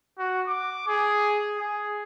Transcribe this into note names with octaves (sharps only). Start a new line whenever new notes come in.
F#4
D6
G#4
G#4